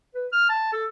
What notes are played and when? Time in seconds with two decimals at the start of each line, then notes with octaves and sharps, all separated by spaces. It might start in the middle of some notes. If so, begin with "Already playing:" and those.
0.14 B4
0.32 F6
0.49 A5
0.73 A4